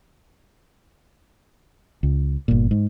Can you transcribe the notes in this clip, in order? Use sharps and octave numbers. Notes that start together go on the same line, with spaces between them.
C#2
G1 A#2
G#2